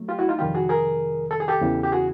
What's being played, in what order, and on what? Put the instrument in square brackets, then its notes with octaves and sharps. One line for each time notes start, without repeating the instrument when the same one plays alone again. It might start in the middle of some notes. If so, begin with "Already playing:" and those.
Already playing: [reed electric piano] F#3 A3
F4 G4
E4 F#4
D#4 F4
F2 C3 D#3 G3 F4 G4
F#4 G#4
G#4 A#4
A4
G#4
G4 A4
E2 C#3 E3
G4
F#4 G#4